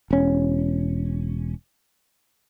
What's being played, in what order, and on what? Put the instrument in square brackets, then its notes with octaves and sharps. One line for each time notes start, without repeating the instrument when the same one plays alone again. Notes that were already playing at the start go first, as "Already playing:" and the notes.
[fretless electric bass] E1 C#4